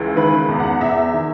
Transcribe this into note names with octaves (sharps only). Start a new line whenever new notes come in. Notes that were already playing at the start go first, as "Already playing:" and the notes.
Already playing: C#2 E3
D#3 B4
E2
F#5
E2 E5
D#3